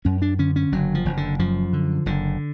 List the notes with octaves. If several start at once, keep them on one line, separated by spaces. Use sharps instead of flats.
F#2 C#4
D4
D3 C#4
C#4
F#1 F#3
F3
F#1
D3
F#2 F3
D3
F#1 D3